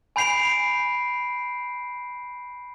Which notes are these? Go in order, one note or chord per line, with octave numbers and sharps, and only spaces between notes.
G#5 B5 G6 C7 D7 F7